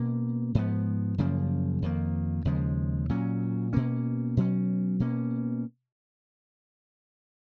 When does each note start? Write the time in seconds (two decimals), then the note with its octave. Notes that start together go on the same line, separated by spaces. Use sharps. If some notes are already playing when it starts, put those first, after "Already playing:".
Already playing: B2 A#3 C#4
0.55 G#2 F3 B3
1.18 F#2 C#3 F3 A#3
1.82 F2 D#3 A#3
2.45 D#2 C#3 F3 G#3
3.09 A#2 F#3 C#4
3.73 B2 A#3 C#4
4.37 B2 F#3 C#4
5.00 B2 A#3 C#4